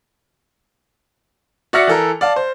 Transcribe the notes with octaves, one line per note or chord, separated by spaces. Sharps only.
F#4 D5 E5 F6 A#6 C#7
E3 A4 A#4
D5 F5 A5
C5